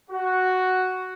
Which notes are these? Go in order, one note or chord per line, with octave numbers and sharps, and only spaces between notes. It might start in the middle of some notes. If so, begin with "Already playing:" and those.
F#4